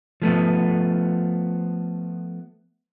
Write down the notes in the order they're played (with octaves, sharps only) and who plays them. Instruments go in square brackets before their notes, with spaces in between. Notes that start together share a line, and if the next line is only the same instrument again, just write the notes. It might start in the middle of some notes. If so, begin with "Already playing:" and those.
[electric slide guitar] F3 A3 B3